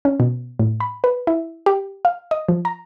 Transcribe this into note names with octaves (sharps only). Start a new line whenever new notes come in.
C#4
B2
A2
B5
B4
E4
G4
F5
D#5
F3
A#5